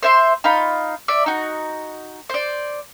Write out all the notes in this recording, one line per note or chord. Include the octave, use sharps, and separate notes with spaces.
C5 E5 C6
D#4 F4 F5 B5
D5 E5
D#4 F#4
C5 D5